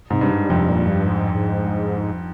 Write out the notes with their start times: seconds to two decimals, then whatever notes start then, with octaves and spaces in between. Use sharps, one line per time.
0.10 G#2 C3
0.21 G2
0.31 G3
0.50 F2 C3
0.69 A#2
0.87 G2
1.06 G#2
1.35 G#2